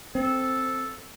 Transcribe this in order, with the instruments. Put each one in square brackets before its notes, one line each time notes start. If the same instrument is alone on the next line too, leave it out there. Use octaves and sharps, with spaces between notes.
[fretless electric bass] C4 [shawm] A4